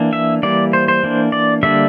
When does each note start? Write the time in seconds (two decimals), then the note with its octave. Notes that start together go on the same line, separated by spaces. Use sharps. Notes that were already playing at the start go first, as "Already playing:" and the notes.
Already playing: E3 A#3 D4
0.13 E5
0.43 E3 G3 A#3 D5
0.73 C5
0.88 C5
1.03 E3 A#3 D4
1.32 D5
1.63 D3 G3 A#3 D4 E5